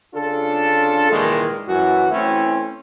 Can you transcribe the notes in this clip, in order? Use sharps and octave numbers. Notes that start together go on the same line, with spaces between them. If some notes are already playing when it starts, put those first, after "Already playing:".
C#3 D4 F4 A4
C2 A#2 D#3 E3 G#3
F#2 E3 F#4
E3 A3 C4 C#4 E4